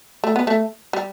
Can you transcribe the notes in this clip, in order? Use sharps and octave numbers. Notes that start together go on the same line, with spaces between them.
A3
B3
A3
G3